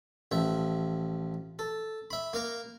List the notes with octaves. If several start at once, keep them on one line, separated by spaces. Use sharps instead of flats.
A1 F3 E5
A4
E5 B5
A#3 F5 A#5